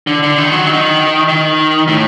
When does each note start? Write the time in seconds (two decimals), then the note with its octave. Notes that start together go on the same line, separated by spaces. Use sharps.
0.07 D3
0.23 D3
0.38 D#3
0.52 F#3
0.67 D#3
1.28 D#3
1.88 A2